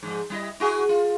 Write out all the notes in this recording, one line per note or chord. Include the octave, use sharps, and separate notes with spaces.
G#2 F3
G3 E4 D#5
E4 F#4 G#4
F4